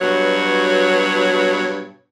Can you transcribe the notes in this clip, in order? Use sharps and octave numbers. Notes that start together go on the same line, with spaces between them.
G2 B2 F#3 C#5